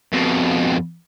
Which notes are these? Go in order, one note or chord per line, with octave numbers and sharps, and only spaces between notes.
F2 B2